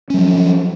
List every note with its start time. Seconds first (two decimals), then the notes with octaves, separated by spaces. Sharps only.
0.10 C#4
0.14 F#3
0.18 F3